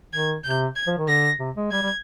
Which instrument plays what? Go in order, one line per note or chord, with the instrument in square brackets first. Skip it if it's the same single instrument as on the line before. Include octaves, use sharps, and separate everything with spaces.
[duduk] D#3 [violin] G#6
[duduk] C3 [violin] G6
[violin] G#6
[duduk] F3
D#3
[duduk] D3 [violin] A#6
[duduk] C3
G#3
[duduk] G3 [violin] G#6
[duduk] G3